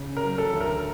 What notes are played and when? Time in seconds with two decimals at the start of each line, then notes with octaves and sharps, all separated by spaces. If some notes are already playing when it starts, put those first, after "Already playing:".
Already playing: C#3
0.17 A#4
0.24 F#3
0.38 A4
0.53 D2
0.60 A#4